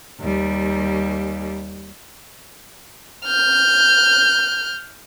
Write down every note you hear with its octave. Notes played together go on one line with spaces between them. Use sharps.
D#2 G3
F6 G6